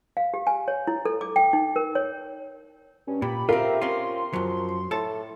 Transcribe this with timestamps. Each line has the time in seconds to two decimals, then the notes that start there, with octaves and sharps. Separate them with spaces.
0.17 F5
0.34 G4
0.47 G#5
0.68 C#5
0.87 E4
1.05 A4
1.21 D6
1.36 G5
1.53 D#4
1.76 A#4
1.95 C#5
3.07 G2 C#4
3.22 A#2 G4 B5
3.49 C4 F4 A#4 E5
3.82 C4 C#4 F4 C6
4.33 F#2 F3 F#3
4.91 A2 A4 A5